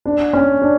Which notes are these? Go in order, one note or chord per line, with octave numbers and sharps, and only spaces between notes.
D4
C#4
D4